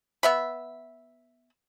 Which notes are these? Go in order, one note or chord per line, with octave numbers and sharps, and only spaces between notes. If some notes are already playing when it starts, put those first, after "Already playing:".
B3 E5 B5